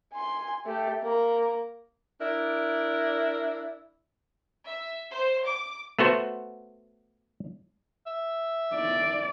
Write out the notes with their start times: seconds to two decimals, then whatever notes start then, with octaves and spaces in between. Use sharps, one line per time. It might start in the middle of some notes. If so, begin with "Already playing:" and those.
0.13 G#5 C6
0.65 A3 G4
1.03 A#3 A#5
2.20 D4 E4 A#4 D5
4.66 E5
5.11 C5
5.45 D6
5.99 A3 B3 F#4 C5
8.07 E5
8.75 D5